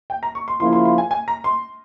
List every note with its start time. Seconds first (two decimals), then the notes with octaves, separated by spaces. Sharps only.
0.10 G5
0.23 A#5
0.35 C#6
0.48 C6
0.60 C#3 F3 A#3 E4 C6
0.73 C6
0.85 C6
0.98 G#5
1.11 G#5
1.28 A#5
1.44 C6